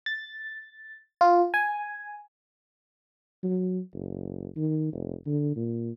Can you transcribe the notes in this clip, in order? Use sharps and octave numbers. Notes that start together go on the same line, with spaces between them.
A6
F4
G#5
F#3
F#1
D#3
F1
D3
A#2